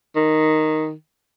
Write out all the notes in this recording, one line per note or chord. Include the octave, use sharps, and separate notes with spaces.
D#3